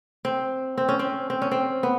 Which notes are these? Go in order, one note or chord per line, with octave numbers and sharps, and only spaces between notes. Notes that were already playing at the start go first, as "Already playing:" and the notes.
C4
C4
C#4
C4
C4
C#4
C4
B3